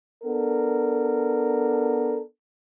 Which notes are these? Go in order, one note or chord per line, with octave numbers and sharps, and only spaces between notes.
B3 D4 A4 A#4